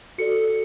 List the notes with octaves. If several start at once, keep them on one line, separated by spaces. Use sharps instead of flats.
F#4 A4 D5 C#7